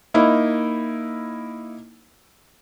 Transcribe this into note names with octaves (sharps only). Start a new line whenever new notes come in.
A#3 D#4 E4